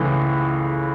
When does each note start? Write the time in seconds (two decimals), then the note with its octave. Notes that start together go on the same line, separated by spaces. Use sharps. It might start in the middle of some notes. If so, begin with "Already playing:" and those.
Already playing: C#2 C#3 E3 A3